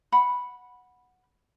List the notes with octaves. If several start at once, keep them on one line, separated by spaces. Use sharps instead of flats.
F#5 B5